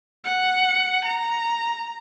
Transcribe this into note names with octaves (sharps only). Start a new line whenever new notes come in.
F#5
A#5